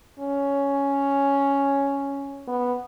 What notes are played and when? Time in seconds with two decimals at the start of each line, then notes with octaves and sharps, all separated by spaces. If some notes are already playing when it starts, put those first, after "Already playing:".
0.19 C#4
2.48 B3